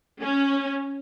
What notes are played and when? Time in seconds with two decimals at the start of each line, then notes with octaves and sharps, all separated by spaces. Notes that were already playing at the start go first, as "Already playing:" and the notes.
0.21 C#4